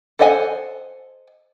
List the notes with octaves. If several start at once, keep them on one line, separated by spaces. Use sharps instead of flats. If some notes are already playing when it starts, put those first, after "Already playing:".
A4 C5 D#5 F#5 G#5